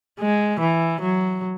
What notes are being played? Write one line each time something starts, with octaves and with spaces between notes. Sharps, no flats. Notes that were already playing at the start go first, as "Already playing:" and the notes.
G#3
E3
F#3